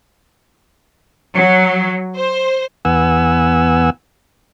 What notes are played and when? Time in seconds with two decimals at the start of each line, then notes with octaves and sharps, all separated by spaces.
1.35 F#3
2.15 C5
2.85 E2 B3 F#5 G#5 E6